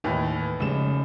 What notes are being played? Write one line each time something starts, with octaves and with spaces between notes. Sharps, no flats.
D#2 A2 E3 D#4
F1 C#3 G#3 C#4 E7